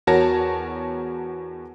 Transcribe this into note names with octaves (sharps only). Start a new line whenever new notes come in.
E2 F#4 A#4 C#5 A5 A#6